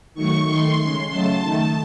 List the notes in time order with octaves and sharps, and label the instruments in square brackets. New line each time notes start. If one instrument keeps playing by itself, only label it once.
[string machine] D#3 F#3 A3 C#6
D#3 A3 C6
C#3 G#3
C#3 F#3 A3 A5
D#3 A3